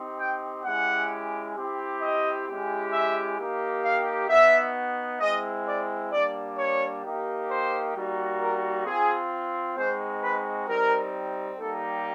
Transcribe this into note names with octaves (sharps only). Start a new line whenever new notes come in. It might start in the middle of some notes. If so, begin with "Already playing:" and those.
Already playing: C4 D#4 G4
G5
G#3 C#4 E4 G4 F#5
C4 E4 G4
D#5
G#3 C#4 E4 G4
E5
A#3 D#4 G4
F5
B3 D#4 F#4 E5
G#3 C4 E4 D#5
D5
G3 A#3 D4 D5
C#5
A#3 D#4 G4
C5
G3 A#3 D#4 F#4
A#4
C4 F4 G#4
G#3 C4 D#4 F#4 C5
B4
G3 C4 D#4 A#4
G3 A#3 D#4 G4 A4